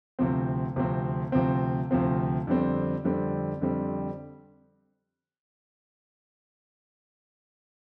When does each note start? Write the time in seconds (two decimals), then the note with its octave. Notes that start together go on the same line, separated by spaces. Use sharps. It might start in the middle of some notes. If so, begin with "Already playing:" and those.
0.19 D2 C3 F3 C4
0.76 D2 C3 F3 C4
1.32 D2 C3 F3 C4
1.91 D2 C3 F3 C4
2.47 F2 D3 G3 C4
3.04 F2 D3 G3 C4
3.62 F2 D3 G3 C4